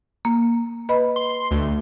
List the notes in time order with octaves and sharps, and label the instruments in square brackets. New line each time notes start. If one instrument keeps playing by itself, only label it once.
[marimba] A#3
B4 D#5 B5
[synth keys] C6
D2